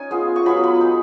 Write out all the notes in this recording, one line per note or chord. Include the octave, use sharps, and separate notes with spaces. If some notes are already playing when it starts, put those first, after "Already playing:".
Already playing: C#4 D#4 G#5
G#3 B3 F4
C#6
F#3 B3 F4 B5
B5
G#3 D#4